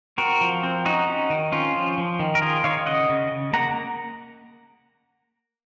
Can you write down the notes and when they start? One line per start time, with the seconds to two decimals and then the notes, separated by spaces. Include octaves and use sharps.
0.18 C4 F#4 A#4
0.41 F3
0.63 C4
0.85 C#4 D#4 F#4
1.07 C#4
1.30 D#3
1.52 C4 C#4 F4
1.75 F3
1.98 F3
2.19 D#3
2.35 A#4
2.42 D#3 F4 G#4
2.64 D#3 C#5 F5
2.86 C#3 D#5 F#5
3.09 C#3
3.32 C#3
3.53 A#3 F#5 A#5